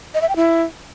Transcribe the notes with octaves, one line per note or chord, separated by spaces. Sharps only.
D#5
E5
G5
E4